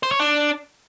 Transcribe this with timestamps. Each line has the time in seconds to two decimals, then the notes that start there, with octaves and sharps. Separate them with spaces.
0.03 C5
0.11 C#5
0.20 D4